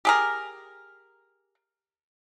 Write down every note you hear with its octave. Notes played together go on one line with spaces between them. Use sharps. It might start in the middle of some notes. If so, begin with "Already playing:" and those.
G4 G#4 A#4